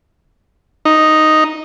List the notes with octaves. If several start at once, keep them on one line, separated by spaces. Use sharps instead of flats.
D#4